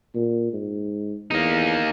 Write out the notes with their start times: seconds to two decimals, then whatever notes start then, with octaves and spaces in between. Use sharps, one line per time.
0.15 A#2
0.53 G#2
1.31 E2 A#3 D#4